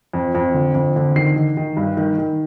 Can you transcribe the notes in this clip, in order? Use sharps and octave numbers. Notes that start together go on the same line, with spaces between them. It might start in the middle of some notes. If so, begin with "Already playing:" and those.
F2
F2
D3
F2
D3
D#3 C7
D#3
D#3
G2
D#3
D#3